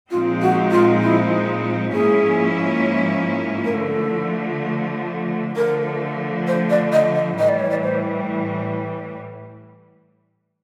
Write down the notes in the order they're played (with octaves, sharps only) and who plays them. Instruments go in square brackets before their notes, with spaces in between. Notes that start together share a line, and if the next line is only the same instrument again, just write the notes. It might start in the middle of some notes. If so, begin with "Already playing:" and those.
[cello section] A#2 F3 G#3 C4 D#4 [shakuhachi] F4
[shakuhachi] F#4
F4
E4
[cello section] G#2 F3 A#3 C#4 E4 [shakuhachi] G#4
[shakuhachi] A#4
[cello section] D3 F3 A3 [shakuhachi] A4
[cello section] D3 F3 A3 [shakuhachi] A#4
[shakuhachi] C5
D5
D#5
D#5
[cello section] A2 E3 G3 [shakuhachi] D#5
[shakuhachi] D5
C#5
D5
C5